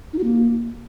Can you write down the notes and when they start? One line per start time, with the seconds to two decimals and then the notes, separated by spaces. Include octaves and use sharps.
0.13 D#4
0.18 F#4
0.24 A#3